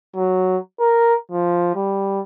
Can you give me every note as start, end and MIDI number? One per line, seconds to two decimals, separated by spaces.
0.16 0.57 54
0.80 1.14 70
1.32 1.75 53
1.76 2.20 55